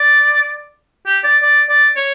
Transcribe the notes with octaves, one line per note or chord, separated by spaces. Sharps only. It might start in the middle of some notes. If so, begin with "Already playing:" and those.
Already playing: D5
G4
D5
D5
D5
C#5